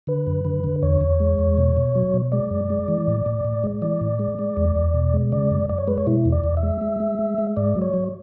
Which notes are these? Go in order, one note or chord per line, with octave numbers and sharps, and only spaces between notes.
D3 B4
F#2
D3
D3
E2 C#5
E2
G#3
E2
B2
B2
F#3
B2
G#3 D5
F#2
G#3
E3
A2
A2
A2
G#3
E3 D5
A2
G#3
G#3
E2
E2
B2
G#3
C#3 D5
F#2
F#2 D5
C#5
G#3 B4
C#5
B2 E4
E2
D5
E2
E5
G#3
G#3
G#3
G#3
G#3
G#2 D5
F#3
C#5
F#3